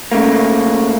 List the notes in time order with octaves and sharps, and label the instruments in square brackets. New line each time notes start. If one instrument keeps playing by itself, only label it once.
[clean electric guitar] G#2 C#3 A3 A#3